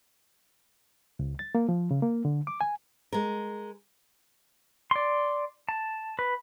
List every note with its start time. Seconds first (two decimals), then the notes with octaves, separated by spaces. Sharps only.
1.19 C#2
1.39 A6
1.55 A#3
1.69 F3
1.91 C#3
2.02 A#3
2.25 D3
2.47 D6
2.61 G#5
3.12 G#3 A#4
4.91 D5 C6
5.69 A5
6.19 B4